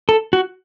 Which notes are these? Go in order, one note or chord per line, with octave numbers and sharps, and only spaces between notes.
A4
F#4